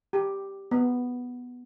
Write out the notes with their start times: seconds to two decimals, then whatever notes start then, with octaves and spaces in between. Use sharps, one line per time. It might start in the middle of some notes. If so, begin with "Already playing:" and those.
0.13 G4
0.71 B3